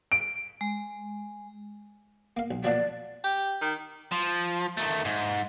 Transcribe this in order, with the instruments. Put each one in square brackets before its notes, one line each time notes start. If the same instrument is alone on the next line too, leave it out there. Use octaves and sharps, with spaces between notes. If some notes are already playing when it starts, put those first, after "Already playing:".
[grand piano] D7
[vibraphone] G#3
[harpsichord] A#3 F5
B1
[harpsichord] A#2 F3 F#3 [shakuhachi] D5
[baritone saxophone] G4
D#3
[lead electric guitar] F3
D#3 A3
G#2